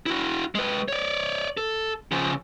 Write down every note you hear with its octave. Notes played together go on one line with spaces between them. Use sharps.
E4 F#4
G#3 B4
C#5 D5
A4
C#3 F3